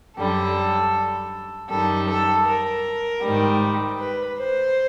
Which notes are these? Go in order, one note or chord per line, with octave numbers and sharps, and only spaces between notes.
F#2 D3 G3 A4
F#2 D#3 G3 A4
A4
A#4
G#2 D#3 G3
B4
C5